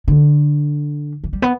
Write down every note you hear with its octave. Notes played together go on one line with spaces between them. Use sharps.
D3
E3
G3
B3